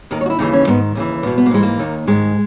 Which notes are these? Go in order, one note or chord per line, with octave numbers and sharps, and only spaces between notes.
D#2 D#3 A#4
C#5
F#4
E4
D#2 C#3 E3 D#4
C#4
G#2 D#3 B3
D#2 C#3 E3
E2 B2 B3
B3
A#3
G#2 E3 G#3
A#3
D#2 D#3
G#2 D#3 G#3